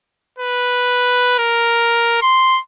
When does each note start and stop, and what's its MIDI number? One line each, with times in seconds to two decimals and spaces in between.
0.39 1.34 71
1.39 2.17 70
2.22 2.60 84